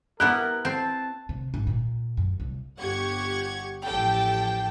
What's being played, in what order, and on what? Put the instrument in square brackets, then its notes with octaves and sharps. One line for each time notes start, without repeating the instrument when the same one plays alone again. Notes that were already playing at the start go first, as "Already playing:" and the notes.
[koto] B3 E4 G4 [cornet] A#4 [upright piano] F#6
[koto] C4 [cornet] A5
[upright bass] C3
G#1
A#2
F#2
C2
[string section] G1 G4 F#5 C#6 G#6
A1 F3 G4 A4 G5 A5